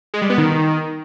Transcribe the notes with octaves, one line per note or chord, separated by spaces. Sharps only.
G#3
G3
B3
D#3